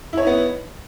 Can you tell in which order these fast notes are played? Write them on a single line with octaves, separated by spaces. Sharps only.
E4 C#5 D#4 B3